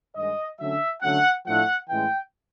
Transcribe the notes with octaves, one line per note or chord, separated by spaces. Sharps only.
G2 D#3 G#3 D#5
D3 F#3 A3 C#4 E5
D3 F#3 A3 C#4 F#5
A2 F3 A3 D4 F#5
A2 E3 G#3 C#4 G5